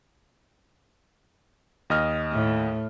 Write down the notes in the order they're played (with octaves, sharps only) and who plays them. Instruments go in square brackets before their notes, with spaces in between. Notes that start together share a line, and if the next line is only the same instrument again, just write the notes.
[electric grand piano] D#2 D#5 F6
[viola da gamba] A2